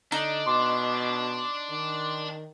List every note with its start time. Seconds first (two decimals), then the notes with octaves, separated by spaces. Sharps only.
0.12 D3 D4 D#4
0.46 B2 C6 D6
1.70 D#3